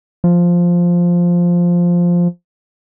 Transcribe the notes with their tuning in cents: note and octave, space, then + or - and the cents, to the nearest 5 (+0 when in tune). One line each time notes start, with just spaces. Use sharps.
F3 +0